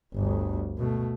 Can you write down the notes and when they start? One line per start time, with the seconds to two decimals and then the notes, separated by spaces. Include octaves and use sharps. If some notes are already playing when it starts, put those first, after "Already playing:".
0.14 G1 D2
0.78 B2 A3